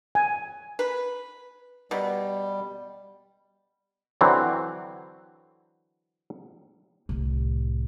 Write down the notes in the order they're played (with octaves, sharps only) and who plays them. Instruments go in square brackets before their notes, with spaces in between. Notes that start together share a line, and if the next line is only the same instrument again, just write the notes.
[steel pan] G#5
[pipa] B4
[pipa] B2 [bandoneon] G3
[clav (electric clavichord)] D3 E3 F#3 C4
[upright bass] C2 A2